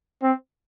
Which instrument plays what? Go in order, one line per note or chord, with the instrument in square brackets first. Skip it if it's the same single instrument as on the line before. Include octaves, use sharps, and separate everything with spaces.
[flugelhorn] C4